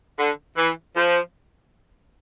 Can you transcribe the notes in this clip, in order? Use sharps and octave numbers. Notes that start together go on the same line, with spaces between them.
D3
E3
F3